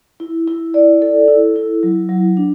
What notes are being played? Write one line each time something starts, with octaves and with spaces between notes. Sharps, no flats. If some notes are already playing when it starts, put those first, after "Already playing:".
E4
E4
D5
A4
E4
E4
F#3
F#3
D4